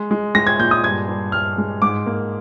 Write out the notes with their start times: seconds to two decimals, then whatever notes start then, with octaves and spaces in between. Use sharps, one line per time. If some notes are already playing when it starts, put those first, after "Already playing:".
Already playing: G#3
0.11 G#3
0.35 G#3 A#6
0.47 G#6
0.59 A#2 G6
0.71 D#6
0.83 G2 G#6
1.08 G2
1.32 G2 F6
1.58 G#3
1.82 G#2 D6
2.06 A#3